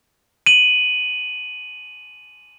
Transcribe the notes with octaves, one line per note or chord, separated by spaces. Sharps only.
D#7 F#7